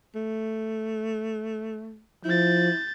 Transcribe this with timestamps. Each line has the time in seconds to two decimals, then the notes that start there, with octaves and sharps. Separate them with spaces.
0.16 A3
2.25 F3 E4 G6 A6